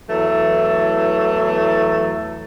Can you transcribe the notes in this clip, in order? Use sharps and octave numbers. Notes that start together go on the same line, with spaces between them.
E2 E3 F#3 A3